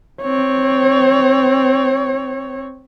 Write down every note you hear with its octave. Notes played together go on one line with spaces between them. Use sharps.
C4 C#5